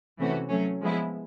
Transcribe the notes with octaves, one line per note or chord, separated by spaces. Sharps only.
C3 E3 A3 C#4 F#4
F#3 A3 C#4
F3 G#3 B3 E4